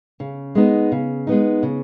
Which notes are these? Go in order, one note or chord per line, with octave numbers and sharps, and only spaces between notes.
C#3
G#3 B3 D#4
C#3
G#3 B3 D#4
C#3